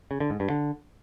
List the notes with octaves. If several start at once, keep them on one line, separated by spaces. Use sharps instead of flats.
C#3
D3
G#2
G2
D3